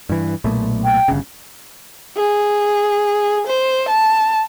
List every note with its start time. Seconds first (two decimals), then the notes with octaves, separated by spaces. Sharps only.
0.09 G2 E3
0.44 B1 A#2 A3
0.84 G5
1.08 G1 C#3
2.17 G#4
3.47 C5
3.89 A5